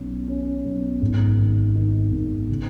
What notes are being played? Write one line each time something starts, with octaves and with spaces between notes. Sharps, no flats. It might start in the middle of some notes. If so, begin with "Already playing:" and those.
Already playing: B1 C#4
C#4
B1
G#1
D#3
D#3
G#1
C#3